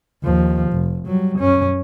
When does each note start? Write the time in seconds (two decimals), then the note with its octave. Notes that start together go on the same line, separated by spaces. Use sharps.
0.23 D#2 F3
0.73 F1
1.06 F#3 G3
1.39 F#2 C#4